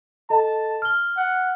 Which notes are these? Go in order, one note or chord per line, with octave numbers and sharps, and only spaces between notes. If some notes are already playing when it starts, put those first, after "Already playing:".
A4 D#5 A5
F6 G7
F#5